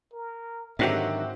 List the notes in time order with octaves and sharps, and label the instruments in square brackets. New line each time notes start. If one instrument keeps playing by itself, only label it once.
[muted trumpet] A#4
[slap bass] G#2 [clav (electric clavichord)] D3 D#3 F#3 [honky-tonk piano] C4 F#4 G4 [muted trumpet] E5